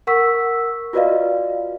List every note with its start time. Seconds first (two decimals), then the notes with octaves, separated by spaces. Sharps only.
0.07 A#4 F#5 C#6 E6 B6
0.93 F4 F#4 B4 D5 D#5 F5